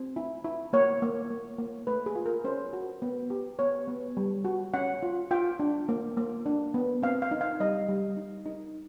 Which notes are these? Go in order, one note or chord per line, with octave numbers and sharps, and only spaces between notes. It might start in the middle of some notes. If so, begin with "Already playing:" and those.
Already playing: C4
E4
E4
A#3 C#5
A#3
A#3
A#3
A3 B4
G#4
F4
A#4
C#4 C5
F#4
B3
G4
B3 C#5
B3
G3
F#4
C#4 F#5
F4
F4 G5
D4
A#3
A#3
D4
B3
C4 F5
F5
D#4
F5
G3 D#5
G3
D#4
D#4